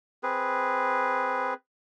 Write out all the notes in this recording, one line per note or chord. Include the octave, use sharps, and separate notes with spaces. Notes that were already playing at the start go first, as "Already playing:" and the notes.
C4 G#4 B4